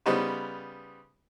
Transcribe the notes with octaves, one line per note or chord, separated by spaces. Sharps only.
C#3 G3 B3 D#4 B4 C5